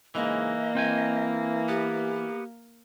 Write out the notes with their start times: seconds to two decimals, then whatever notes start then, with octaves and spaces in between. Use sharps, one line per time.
0.15 G#2 C#3 E3 G#3 A#3 D#5
0.75 E3 C4 G5 G#5
1.68 B3 G4